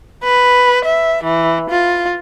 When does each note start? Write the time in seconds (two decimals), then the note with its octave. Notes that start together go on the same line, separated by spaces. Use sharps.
0.24 B4
0.85 E5
1.24 E3
1.70 F4